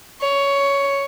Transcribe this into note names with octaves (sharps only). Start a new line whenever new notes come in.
C#5